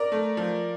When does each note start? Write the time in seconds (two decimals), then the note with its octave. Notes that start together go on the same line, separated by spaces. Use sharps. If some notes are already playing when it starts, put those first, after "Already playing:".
Already playing: A#4 D5
0.12 A3
0.37 F3